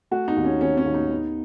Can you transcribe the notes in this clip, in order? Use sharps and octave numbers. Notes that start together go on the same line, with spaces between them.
A3 F#4
D#4
D#2
C#4
D#3 C#4
C#4
D#2
D#4
B3